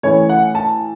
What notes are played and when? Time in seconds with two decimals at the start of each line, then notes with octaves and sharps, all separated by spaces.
0.03 A2 E3 A3 C#4 C#5
0.29 F#5
0.55 A5